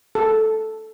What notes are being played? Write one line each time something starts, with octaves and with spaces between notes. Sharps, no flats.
A4